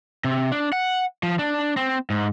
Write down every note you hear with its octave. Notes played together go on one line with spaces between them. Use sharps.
C3
D4
F#5
F3
D4
C4
G#2